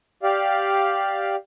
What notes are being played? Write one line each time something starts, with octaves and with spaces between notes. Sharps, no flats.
G4 D5 F5